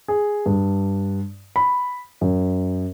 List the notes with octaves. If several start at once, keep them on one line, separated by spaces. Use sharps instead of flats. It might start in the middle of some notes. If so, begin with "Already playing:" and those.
G#4
G2
B5
F#2